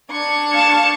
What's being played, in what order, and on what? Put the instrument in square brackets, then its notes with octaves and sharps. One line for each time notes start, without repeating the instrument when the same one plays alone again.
[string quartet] D4 C#6 G#6
[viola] F5 A5